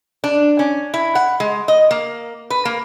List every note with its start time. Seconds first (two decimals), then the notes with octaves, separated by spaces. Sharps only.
0.24 D4
0.59 C#4
0.94 E4
1.15 F#5
1.40 G#3
1.68 D#5
1.91 A#3
2.50 B4
2.65 A#3